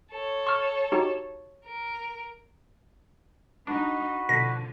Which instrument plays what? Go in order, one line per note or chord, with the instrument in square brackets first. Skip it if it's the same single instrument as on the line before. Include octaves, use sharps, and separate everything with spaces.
[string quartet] A4 C#5
[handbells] C#6 F6
D#4 F#4 G4
[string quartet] A#4
[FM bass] D4 [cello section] D#4 [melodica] F#4 B4
[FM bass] B2 [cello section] D3 F3 [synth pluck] A#6 B6